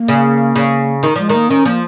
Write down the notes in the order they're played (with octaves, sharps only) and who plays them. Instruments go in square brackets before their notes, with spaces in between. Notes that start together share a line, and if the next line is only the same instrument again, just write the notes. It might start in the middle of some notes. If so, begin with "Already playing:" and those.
Already playing: [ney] A#3
[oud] C#3
C#3
D#3
[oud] F3 [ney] G#3
[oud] D#3 [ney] A#3
[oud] D#3 [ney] C#4
[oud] F3 [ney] A#3